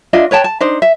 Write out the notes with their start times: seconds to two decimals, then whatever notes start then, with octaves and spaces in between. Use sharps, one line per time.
0.13 D4 F4 D#5 E5
0.31 B4 C#5 G5 A5
0.44 A5
0.60 D4 D#4 C5
0.82 E5